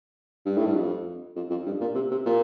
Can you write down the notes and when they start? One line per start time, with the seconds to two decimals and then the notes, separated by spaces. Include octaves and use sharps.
0.46 G2
0.57 A2
0.66 G2
0.76 F2
1.36 F2
1.50 F2
1.66 G2
1.81 A#2
1.95 C3
2.11 C3
2.26 A#2